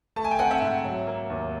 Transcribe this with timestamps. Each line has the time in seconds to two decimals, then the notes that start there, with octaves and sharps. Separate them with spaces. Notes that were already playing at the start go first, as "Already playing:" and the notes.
0.16 A3 A5
0.24 G#5
0.31 G5
0.39 C4 F#5 G#5
0.50 E5 F#5
0.61 G#2
0.84 F#3
1.07 A#3
1.30 D#2